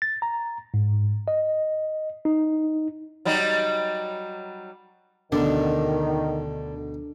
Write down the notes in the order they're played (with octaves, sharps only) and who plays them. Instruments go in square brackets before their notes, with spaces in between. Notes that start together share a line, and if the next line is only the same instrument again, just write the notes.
[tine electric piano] A6
A#5
G#2
D#5
D#4
[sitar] F#3 G3 D#4
[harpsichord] D2 B2 F#5 [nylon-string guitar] D3 [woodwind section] D#3 [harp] D4